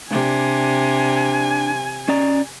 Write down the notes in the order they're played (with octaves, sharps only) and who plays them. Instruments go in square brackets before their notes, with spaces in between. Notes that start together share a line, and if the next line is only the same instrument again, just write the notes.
[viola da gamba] C3 [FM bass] D4 [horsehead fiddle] G#5
[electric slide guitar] C#4 D5 A#5